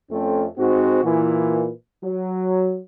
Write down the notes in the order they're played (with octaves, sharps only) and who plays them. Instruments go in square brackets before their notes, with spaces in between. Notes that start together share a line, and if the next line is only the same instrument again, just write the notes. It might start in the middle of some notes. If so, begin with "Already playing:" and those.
[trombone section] F2 A3 C4 C#4
G#2 C4 F#4
A#2 E3
F#3